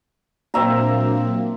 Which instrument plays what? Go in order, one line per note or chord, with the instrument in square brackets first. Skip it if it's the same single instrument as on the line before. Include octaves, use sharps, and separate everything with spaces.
[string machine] A#2 F#3 D4 [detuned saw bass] A#3 [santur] C4 E5 A#5